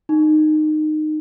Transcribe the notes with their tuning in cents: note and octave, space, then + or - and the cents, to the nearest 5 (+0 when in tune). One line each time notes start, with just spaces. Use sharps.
D#4 -20